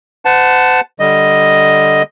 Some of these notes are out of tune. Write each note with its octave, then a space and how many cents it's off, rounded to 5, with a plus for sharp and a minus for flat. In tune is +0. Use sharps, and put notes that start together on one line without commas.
C5 -40 F#5 +0 A5 +0
D3 +0 G3 -5 D#5 +0